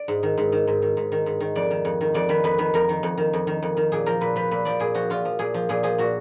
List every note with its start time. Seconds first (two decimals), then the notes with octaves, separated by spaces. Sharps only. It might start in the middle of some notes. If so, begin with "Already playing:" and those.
Already playing: D5
0.08 G#2
0.23 D#3
0.38 G#2
0.52 D#3
0.67 G#2
0.82 D#3
0.97 G#2
1.12 D#3
1.26 G#2
1.40 D#3
1.56 F2 D5
1.71 D#3
1.85 F2
2.01 D#3
2.14 F2 D5
2.29 D#3 B4
2.44 F2 B4
2.58 D#3 B4
2.74 F2 A#4
2.89 D#3
3.03 F2
3.18 D#3
3.33 F2
3.47 D#3
3.62 F2
3.77 D#3
3.92 A#2 G#4
4.06 F3 A#4
4.21 A#2 B4
4.36 F3 B4
4.51 A#2 B4
4.65 F3 D5
4.80 A#2 G#4
4.95 F3 F#4
5.10 A#2 F4
5.25 F3
5.39 A#2 G#4
5.54 F3
5.69 A#2 G#4
5.83 F3 G#4
5.98 A#2 F#4